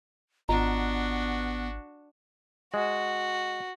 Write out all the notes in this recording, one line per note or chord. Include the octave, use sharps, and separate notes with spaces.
G#1 B3 D4 F4 F#4 D#5 A#5
G#3 F#4